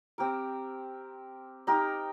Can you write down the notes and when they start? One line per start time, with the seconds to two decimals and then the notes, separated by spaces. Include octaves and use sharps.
0.18 C4 G4 A#4
1.67 D#4 G4 A#4